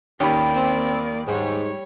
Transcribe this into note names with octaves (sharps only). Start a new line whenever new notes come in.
D#2 A#3 C#4 G4 D5 G5 B5
C4
G#2 G3 C#5